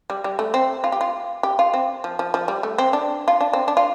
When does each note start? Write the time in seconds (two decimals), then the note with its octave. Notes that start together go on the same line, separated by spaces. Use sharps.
0.10 G3
0.24 G3
0.39 A3
0.54 C4
0.84 F4
0.92 G4
1.01 F4
1.43 G4
1.59 F4
1.74 C4
2.04 F3
2.19 F3
2.34 F3
2.48 G3
2.63 A3
2.78 C4
2.93 D4
3.28 F4
3.40 D4
3.53 C4
3.68 D4
3.77 F4